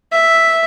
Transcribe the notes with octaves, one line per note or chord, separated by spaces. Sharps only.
E5